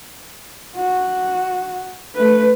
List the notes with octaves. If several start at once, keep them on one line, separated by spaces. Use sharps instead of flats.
F#4
A3 B4